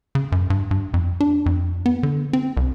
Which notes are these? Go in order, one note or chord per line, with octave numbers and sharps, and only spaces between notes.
C#3
F#2
G2
G2
F2
D4
F2
B3
D3
C4
C2